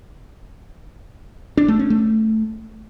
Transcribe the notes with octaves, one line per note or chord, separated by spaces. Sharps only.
D4
A3
C#4
A3